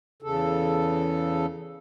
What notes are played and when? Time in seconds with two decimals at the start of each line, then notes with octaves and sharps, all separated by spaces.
0.22 E2 C#3 A4